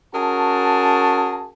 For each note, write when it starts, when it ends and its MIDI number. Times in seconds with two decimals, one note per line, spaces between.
0.14 1.51 61
0.14 1.51 66
0.14 1.51 68
0.14 1.51 70
0.14 1.51 81